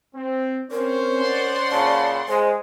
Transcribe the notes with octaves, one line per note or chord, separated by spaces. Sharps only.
C4
C4 C#4 A#4 C5 C#5
D5 F#5 C6
A#2 C#3 A5
G#3 C5